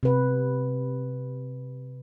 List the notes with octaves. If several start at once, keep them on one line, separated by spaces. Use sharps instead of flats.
C3 B4